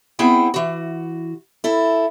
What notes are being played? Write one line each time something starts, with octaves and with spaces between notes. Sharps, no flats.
B3 C4 E4 G#4 F#5 G5
E3 F#4
E4 A4